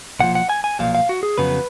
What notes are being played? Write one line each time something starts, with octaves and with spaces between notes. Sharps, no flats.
B1 A#2 F3 F#5
F#5
G#5
G#5
B1 A#2 F3 F5
F5
F#4
G#4
F2 C#3 F#3 B3 B4